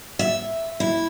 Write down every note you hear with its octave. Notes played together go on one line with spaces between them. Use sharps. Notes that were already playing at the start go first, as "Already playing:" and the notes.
E5
E4